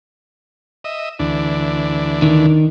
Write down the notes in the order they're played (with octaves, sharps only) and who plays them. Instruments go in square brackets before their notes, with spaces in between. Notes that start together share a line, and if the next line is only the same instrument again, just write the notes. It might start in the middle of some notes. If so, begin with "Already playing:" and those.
[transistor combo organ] D#5 E5
D2 E3 D4
[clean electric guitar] D#3